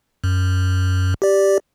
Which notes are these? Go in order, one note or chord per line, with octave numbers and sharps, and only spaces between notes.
F#2
G4 D5